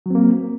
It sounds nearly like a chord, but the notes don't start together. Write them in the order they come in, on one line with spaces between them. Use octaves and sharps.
F#3 C4 A#3